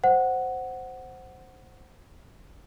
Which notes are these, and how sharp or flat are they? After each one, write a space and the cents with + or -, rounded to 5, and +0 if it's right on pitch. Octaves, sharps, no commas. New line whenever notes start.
C5 +0 F#5 +5